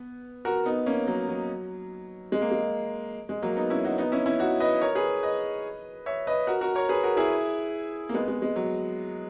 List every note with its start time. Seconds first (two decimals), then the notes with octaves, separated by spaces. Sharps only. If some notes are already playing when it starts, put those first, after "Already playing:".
Already playing: B3
0.45 F#4 A#4
0.66 B3 D#4
0.86 A#3 C#4
1.07 F#3 A#3
1.28 F#3
2.32 G#3
2.42 A#3
2.51 G#3
3.29 G#3
3.42 F#3 A#3
3.57 B3 D#4
3.70 C#4 E4
3.85 D#4 F#4
3.98 B3 D#4
4.12 C#4 E4
4.26 C#4 E4
4.39 D#4 F#4
4.60 B4 D#5
4.82 A#4 C#5
4.95 G#4 B4
5.23 B4 D#5
6.06 C#5 E5
6.27 B4 D#5
6.47 F#4 A#4
6.61 F#4 A#4
6.75 A#4 C#5
6.89 G#4 B4
7.03 F#4 A#4
7.17 E4 G#4
8.09 A#3
8.14 G#3 B3
8.28 G#3
8.42 G#3
8.56 F#3